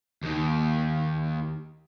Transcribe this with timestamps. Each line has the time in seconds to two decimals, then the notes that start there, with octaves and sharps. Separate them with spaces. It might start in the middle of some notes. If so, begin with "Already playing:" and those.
0.23 D#2 D#3